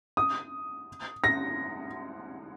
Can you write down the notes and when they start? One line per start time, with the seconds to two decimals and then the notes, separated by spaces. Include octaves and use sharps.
0.17 D#6
1.24 A#6